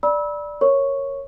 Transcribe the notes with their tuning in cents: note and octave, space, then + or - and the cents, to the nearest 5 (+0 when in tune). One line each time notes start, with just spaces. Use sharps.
D5 +0 B5 -30 E6 -25
A#4 +0 C#5 -10 C#6 +0